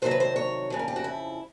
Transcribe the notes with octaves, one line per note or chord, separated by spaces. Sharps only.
F2 C3 D#3 F#3 C5
B4
C5
C#5
F2 C#3 F3
A#4
G4
F#4
E4